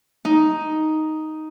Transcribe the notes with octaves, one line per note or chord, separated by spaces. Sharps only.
D#4